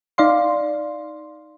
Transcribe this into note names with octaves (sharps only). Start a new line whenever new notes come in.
D#4 D5 F5 C6